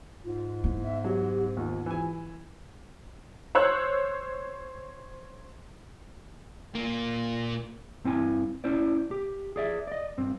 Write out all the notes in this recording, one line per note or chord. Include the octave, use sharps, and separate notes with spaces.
G#2 F4
B3 E4
E5
F#3 G4
D#2 F4
E3 G#5
C5 C#5 E6 F#6
A#2 A#3
G2 C4 E4 G#5
C#4 E4 C5 D5
G4
G#4 D5 E5
D5 D#5
G2 C4